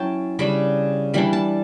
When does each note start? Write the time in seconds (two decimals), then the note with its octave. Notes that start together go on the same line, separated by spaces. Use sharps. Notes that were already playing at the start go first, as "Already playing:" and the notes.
Already playing: F#3 C#4 E4 G5 A5
0.39 C#3 G3 D4 B5
1.14 E3 G3 D4 B5
1.33 A5